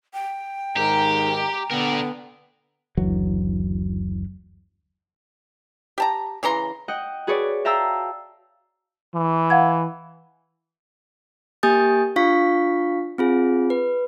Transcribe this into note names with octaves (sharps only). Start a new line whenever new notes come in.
G5
G#2 D#3 G4 A#5
D3 B3 A#4 D5
F#1 D2 E3 F#3
G4 A5 A#5
C#3 E3 A#5 C6
D#5 F#5 G5
F#4 G#4 B4 C#5 D5
E5 F5 G5 A5 A#5 E6
E3
F5 F#5 G#6
A#3 G4 G#5 D#6 G6 A6
D4 F4 F5 C#6 B6
C4 F4 G#4
B4